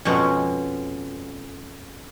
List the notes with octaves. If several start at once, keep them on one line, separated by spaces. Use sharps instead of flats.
F2 B2 G#3 C#4 A#5